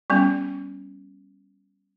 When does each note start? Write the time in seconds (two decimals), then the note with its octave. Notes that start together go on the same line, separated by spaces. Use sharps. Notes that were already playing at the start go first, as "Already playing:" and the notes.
0.10 G3 B3 C#4